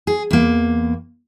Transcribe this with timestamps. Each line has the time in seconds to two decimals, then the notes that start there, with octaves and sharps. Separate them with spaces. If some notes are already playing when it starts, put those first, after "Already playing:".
0.07 G#4
0.31 E2 A#3